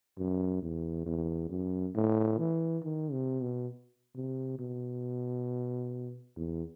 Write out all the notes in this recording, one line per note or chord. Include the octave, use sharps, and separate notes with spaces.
F#2
E2
E2
F#2
A2
E3
D#3
C3
B2
C3
B2
E2